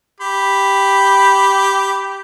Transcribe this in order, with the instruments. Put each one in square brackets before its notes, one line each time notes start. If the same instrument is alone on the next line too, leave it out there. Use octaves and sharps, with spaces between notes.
[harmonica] G4 B5